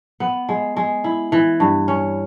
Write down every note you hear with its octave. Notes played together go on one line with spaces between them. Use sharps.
B3
G#3
G#3
E4
E3
G2
C#4